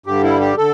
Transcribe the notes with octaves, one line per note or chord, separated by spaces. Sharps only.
G2 D3 G3 G4
E4
G4
D3 A4